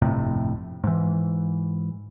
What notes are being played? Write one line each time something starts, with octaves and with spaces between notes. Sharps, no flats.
G1 F2 A2 C3
G#2 E3